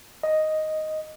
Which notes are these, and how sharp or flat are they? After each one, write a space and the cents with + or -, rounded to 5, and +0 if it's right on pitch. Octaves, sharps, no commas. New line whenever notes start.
D#5 +0